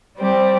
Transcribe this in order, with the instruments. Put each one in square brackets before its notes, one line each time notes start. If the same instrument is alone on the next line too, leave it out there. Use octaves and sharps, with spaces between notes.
[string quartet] G3 C4 G4